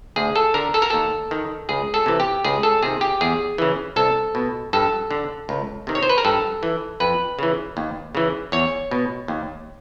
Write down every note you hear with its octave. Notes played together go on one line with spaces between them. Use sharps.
D2 G#4
A4
D3 A#4
A4
A#4
D#2 A4
D#3
C#2 G#4
A4
C3 E3
G4
C#2 G#4
A4
C3 D#3 G#4
G4
E2 G#4
C#3 E3
C2 A4
B2
G2 A4
D3
C#2
C3 D#3
C#5
C5
B4
A#4
G2 A4
E3
F2 B4
C#3 E3
D#2
C#3 E3
E2 C#5
B2
D#2